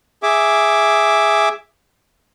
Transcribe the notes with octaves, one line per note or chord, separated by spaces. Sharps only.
G#4 E5 D6